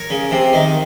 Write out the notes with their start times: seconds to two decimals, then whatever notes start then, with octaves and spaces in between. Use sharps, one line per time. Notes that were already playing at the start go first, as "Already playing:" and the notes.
Already playing: A#4 C#5
0.10 C#3
0.31 C3
0.53 D#3